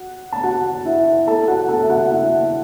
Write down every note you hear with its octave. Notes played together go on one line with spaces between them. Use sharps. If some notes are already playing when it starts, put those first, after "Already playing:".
Already playing: F#4 F#5
A5
F#4 F#5
E4 E5
A4 A5
F#4 F#5
A4 A5
E5
F#4 F#5
E4 E5